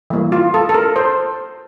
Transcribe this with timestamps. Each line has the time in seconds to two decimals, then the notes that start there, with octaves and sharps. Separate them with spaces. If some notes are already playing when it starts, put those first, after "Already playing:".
0.10 E3 G3 A#3
0.32 F4
0.54 A4
0.69 A4
0.74 A#4
0.96 C5